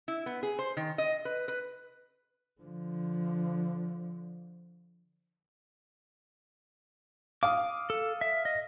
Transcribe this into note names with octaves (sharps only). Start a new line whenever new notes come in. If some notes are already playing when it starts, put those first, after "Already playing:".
E4
B3
G#4
C5
D#3
D#5
B4
B4
D3 F3
F5 D6 D#6
A4
E5
D#5